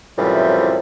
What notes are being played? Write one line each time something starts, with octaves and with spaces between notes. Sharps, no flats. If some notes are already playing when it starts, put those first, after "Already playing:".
F#2 A2 C3 E3 F3 G3